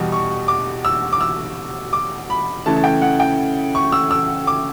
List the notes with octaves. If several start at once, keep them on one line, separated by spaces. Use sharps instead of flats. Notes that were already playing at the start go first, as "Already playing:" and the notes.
Already playing: E2 B2 G3
C#6
D6
E6
D6
E6
D6
B5
C#3 E3 A3 A5
A5
G5
F#5
G5
C#6
E6
E6
D6